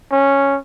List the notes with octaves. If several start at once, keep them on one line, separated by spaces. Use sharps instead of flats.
C#4